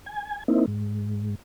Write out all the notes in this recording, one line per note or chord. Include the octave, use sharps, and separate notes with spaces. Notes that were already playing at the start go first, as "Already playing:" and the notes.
G#5
A#3 C4 D#4 E4
G#2